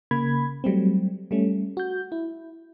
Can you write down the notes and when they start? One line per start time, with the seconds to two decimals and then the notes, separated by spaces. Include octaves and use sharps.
0.11 C#3 A#3 B5 G#6
0.64 F#3 G3 A3 C4
1.31 G3 A3 C#4
1.77 F#4 G6
2.12 E4